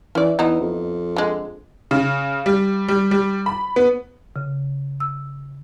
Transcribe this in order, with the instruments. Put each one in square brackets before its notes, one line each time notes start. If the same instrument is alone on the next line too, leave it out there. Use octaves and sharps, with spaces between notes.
[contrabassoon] E3 [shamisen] C#4 D5
[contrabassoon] E2 [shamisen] B3 D#4 E4
[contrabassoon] F2
[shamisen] D3 G#3
[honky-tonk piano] C#3
G3
G3
G3
B5
B3
[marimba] C#3
E6